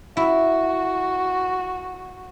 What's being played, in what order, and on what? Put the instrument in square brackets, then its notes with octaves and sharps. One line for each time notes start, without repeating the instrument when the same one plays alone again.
[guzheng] E4 [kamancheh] F#4